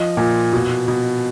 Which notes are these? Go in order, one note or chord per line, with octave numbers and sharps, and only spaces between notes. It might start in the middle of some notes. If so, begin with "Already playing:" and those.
Already playing: F3 D#5
A#2
B2
B2